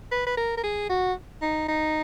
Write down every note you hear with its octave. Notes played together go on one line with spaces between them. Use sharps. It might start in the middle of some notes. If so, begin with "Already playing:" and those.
B4
B4
A#4
A#4
G#4
F#4
D#4
D#4